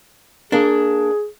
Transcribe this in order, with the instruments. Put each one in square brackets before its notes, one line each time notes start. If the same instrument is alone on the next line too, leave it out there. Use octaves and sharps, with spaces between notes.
[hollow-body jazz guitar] A#3 D4 [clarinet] G#4